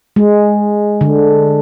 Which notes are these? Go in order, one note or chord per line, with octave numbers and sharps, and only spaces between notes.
G#3
D3